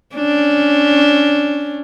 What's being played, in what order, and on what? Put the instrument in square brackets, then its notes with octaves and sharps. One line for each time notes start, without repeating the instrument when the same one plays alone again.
[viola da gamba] C#4 D4